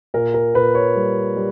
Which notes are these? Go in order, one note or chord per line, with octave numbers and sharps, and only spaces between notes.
A#2 A#4
A#4
A#2 B4
C#5
G3
G3